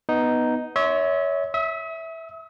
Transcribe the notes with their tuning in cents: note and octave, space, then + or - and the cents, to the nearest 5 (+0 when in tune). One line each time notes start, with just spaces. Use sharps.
B3 +0 D#4 +0
C#5 +20 E5 -30 C6 +0
E5 -10 D#6 +45